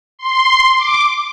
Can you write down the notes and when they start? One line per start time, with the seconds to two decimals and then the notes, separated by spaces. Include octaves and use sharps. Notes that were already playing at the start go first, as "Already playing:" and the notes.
0.19 C6
0.78 D6